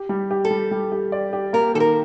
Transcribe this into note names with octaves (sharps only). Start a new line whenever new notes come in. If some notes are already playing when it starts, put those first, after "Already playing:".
Already playing: G4
G3
G4
A4
G3
G3
G4
D5
G4
A#3 A#4
D#3 A4
A#4